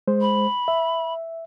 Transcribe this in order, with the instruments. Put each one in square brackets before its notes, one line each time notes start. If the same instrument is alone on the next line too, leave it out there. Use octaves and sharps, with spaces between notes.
[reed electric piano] G#3 C5
[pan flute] B5
[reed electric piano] E5